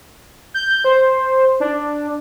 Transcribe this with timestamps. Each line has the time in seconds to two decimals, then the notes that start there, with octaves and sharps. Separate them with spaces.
0.54 G6
0.84 C5
1.60 D4